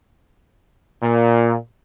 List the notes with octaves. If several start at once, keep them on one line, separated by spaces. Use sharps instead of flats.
A#2